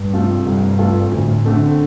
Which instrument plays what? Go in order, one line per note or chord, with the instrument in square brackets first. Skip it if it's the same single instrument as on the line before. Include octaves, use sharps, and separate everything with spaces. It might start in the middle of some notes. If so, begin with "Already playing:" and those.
Already playing: [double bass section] G2
[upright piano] C3 A3 F4 A4
[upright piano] C2 [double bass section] G2
[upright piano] C3 A3 F4 A4
[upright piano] D2 [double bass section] A2
[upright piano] D3 A3 C4